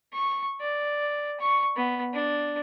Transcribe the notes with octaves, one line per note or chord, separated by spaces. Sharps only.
C#6
D5
C#6
B3
D4